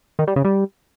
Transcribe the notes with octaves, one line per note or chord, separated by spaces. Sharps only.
D#3
G3
C#3
G3